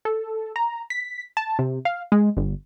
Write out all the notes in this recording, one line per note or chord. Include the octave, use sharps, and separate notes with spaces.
A4
A#5
B6
A5
C3
F5
G#3
G1